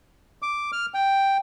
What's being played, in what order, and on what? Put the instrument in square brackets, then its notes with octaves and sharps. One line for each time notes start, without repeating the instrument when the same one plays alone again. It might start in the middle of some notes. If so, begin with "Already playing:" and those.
[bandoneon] D6
F6
G5